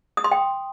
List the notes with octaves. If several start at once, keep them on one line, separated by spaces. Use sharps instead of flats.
D#6
C6
G5